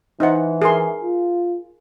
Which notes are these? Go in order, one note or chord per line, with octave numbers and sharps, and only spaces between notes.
E3 D#4 C5 F#5
G#4 A#4 C6
F4